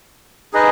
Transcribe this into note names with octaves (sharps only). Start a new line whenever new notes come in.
D#4 G#4 B4 D#5